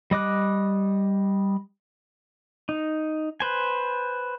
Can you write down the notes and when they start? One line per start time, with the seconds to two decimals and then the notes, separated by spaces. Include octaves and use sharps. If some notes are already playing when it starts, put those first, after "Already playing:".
0.11 G3 D#5 D6 F#6
2.69 D#4
3.40 B4 C5 G#5